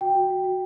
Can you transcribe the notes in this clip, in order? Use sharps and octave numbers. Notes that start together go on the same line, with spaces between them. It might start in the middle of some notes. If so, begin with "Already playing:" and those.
F#4 G5
F#4
F#4
F#4